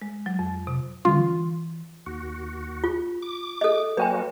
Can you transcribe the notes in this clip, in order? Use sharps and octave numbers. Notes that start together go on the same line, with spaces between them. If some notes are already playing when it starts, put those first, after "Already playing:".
G#3
F#3
F2
C3
D3 G3 C#4 F4
E3
D#2 F#4
F4
D6
A4 D#5
F#3 A#3 F#4 B4 G5 G#5